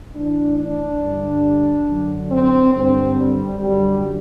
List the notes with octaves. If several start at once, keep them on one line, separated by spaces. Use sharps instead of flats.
A2 E3 D4
D4
G2 D3
F#2 D3
C4
G2 D3 C4
G3
F#2 D3 G3